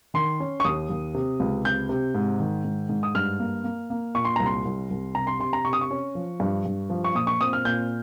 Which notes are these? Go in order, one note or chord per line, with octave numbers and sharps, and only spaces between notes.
D#3 C6
C#4
C#6
D#2 D#6
D#2
C3
C#2
C3 G6
C3
G#2
D#3
G#2
G#2
D#6
G2 F6
A#3
A#3
A#3
A#2 C#6
C6
C2 A#5
C6
C2
C2
C3 A#5
C6
C3 C6
A#5
C3 C#6
D#6
C#6
C#4
F3
G2
G2
F3
C#6
A#2 D#6
C#6
C4 D#6
F6
A#2 G6